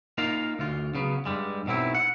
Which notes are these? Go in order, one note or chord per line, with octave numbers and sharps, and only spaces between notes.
A#3 D#4 F4 A#4 F5
D2 F4
C#3 F#3 B3
G2 G3 G#3
B1 B2 F#3 C4 E4
F#5